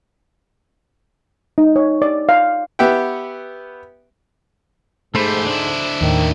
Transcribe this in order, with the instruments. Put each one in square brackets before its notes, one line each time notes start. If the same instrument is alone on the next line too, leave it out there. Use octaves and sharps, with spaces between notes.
[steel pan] D#4
C#5
D5
F5
[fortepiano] B3 G4 E5 F#5 G5
[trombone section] G#2 [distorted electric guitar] A3 G4 [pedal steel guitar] A4 C5 B5
[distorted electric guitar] D4 E4
[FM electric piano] D#2 A2 [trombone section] D#3